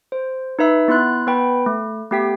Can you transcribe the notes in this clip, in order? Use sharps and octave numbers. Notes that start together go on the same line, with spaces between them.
C5
D#4 B4 E5 E6
B3 E4 C6 F#6
B3 B4 G5 B5
A3
A3 B3 G4 G5 B6